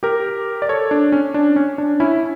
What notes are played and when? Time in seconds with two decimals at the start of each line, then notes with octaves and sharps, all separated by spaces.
0.03 G4 A#4
0.62 D5
0.69 A4 C#5
0.91 D4
1.12 C#4
1.34 D4
1.56 C#4
1.78 D4
2.00 C#4 E4